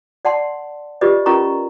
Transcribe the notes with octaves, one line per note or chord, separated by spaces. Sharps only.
D5 F#5 A5 C6
F4 G4 B4 D5 D#5
C#4 F4 A#4 D#5 A#5 C#6